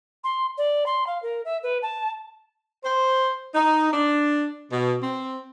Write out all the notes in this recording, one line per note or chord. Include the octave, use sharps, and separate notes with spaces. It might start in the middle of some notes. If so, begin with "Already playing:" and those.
C6
D5
C6
F5
A#4
E5
B4
A5
C5
D#4
D4
B2
C4